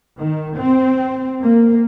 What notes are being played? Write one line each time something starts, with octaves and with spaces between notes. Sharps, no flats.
D#3
C4
A#3